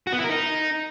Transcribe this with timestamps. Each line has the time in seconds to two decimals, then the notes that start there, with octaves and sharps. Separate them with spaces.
0.07 F#4
0.13 B3
0.18 E4
0.24 A#4
0.30 D#4